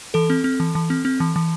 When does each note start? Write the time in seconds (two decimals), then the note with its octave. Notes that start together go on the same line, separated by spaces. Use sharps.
0.14 E3 A4
0.30 C4
0.44 C4
0.60 E3
0.75 E3
0.90 C4
1.05 C4
1.20 E3
1.36 E3